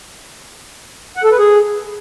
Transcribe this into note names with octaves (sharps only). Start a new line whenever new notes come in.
F#5
A4
B4
G#4